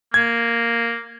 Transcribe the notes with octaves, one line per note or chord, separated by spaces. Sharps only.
A#3 G#6